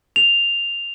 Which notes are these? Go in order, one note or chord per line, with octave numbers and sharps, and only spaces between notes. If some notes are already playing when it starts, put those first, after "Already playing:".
F7